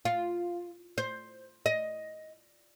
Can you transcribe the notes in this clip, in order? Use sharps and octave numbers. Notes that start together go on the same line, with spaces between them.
F4
C5
D#5